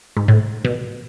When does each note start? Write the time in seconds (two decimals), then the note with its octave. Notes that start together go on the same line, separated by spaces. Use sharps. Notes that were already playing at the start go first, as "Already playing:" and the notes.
0.17 G#2
0.28 A2
0.65 B2